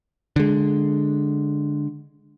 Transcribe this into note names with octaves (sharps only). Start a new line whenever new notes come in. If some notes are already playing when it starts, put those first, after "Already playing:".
D3 G#3